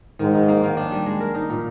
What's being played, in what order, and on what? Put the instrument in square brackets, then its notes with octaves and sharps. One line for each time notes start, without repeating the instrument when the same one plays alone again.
[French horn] G#2 [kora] D#3
[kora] D#4
A#3
D#3
D4
G3
G#3
A#4
D#4
A#2